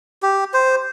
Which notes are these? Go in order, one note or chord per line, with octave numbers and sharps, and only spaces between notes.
G4
C5